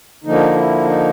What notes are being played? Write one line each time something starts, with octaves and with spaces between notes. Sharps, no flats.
D3 F3 A#3 D#4
E4
D#4